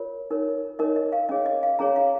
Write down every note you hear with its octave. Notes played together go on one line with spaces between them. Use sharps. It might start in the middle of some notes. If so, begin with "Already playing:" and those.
Already playing: F4 A#4 C#5
D#4 A#4 C#5
D#4 A#4 C#5 D#5
D#5
F5
C#4 G#4 C#5 D#5
D#5
F5
C#4 G#4 C#5 A#5
F5